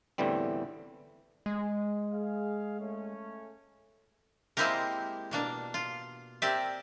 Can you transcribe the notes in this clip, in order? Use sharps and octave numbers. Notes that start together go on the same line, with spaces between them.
E2 A2 D3 E3 G3 C4
G#3
G#4 F5
A3 C#4
G#3 A#3 C4 E4 G4 A#4
B2 A#3 D4
F4
C4 G4 A#4 D5 E5